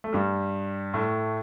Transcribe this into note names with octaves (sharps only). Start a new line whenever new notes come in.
A3
G2 G3
A2 A3